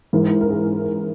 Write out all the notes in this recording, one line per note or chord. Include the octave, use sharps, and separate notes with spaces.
G#2 E3 A#4
A#4
G#4